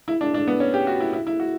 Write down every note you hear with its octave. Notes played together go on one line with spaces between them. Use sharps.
E4
D4
D4
B3
C#4
G4
F#4
E4
E4
E4
F#4